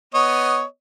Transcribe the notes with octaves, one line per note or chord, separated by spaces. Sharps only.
B3 C#5 D#5